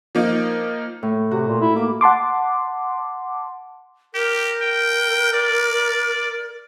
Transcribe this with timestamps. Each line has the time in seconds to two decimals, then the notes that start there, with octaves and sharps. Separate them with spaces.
0.15 F3 A#3 D#4
1.03 A2
1.31 C3 F#4
1.48 A#2
1.62 E4
1.76 A#3 D6
2.01 F#5 A5 C6 D6
4.14 G4 A#4
4.61 G5
5.33 D5